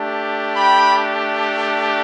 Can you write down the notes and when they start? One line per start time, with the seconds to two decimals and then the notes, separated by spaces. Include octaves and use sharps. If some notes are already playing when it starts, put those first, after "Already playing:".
Already playing: A3 D4 G4
0.56 G5 B5